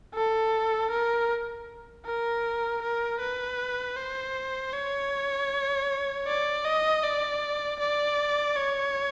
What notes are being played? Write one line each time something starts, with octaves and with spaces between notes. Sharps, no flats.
A4
A#4
A#4
A#4
B4
C5
C#5
D5
D#5
D5
D5
C#5